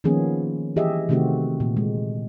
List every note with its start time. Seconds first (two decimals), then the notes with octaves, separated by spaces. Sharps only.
0.04 D#3 F3 A#3 B3 C#4 G#4
0.76 E3 G4 G#4 D#5 E5
1.09 C3 D#3 A3 C4 F#4 G4
1.60 A#2
1.77 G#3